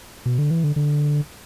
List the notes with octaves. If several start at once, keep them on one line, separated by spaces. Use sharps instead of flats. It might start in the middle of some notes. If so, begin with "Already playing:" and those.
B2
D3
E3
D3
D3